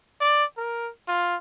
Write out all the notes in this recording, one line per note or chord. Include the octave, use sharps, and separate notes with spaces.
D5
A#4
F4